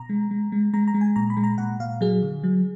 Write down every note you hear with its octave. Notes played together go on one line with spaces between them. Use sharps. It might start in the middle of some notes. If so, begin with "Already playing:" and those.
Already playing: B2 A#5
G#3
G#3
G#3
G#3 A#5
A#5
G#3
G#5
A#2 A#5
B5
G#3
A#5
A#2 F#5
A#2 F5
F#3 G#4
D3
F#3